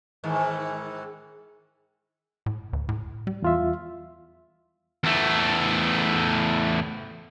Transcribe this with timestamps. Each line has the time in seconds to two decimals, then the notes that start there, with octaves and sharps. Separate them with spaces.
0.24 G#2 D#3 E3
2.46 A2
2.73 D2
2.89 A2
3.27 G3
3.42 E2 F4 E5
5.04 E2 A3